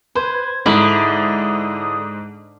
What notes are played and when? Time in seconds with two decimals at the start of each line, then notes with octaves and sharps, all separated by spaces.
0.15 B4 C5 G#6
0.66 G#2 D3 E4 D#6